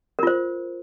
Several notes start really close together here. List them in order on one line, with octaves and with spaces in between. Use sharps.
A#4 F4 C5